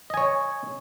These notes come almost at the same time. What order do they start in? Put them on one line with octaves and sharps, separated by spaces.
D#5 G#5 C#5